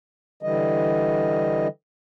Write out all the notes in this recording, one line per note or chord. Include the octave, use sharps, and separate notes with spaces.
D3 E3 G3 D#5